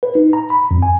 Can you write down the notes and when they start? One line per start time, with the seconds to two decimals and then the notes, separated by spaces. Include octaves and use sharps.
0.03 B4
0.15 D#4
0.33 A#5
0.50 B5
0.71 F2
0.82 G#5